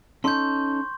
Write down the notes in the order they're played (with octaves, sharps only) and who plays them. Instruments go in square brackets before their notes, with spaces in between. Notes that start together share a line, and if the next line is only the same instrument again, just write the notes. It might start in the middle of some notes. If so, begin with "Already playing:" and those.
[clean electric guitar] C#4 D#4 A4 [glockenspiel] C6 C#6 G6